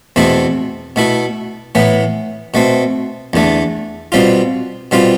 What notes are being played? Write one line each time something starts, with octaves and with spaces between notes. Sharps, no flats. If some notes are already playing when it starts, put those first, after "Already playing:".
E2 B2 A3 C4 E4
B2 A3 E4
A2 E3 B3
B2 A3 C4
E2 D3 A3
B2 G3 C4 F4
B2 G3 C4 F4